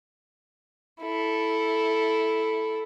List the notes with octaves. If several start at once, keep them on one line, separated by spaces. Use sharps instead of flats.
E4 A4